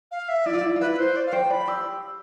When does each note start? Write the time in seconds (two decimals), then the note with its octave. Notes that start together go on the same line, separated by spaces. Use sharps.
0.11 F5
0.28 E5
0.46 E4 D5
0.53 F4
0.61 E4
0.76 F4
0.80 E4 B4
0.99 C5
1.16 D5
1.26 F5
1.33 C5 G5
1.50 D5 B5
1.68 G4 E6